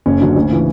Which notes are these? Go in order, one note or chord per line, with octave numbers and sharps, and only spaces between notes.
F#1 C#4
F#2 D3
D2
C#3 E3